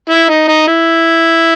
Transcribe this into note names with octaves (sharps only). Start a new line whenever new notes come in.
E4
D#4
D#4
E4